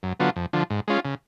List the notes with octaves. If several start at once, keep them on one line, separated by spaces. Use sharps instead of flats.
F#2
D3 F#3 B3 F4
F2
D3 F3
G#2
G#3 C#4 F4
C#3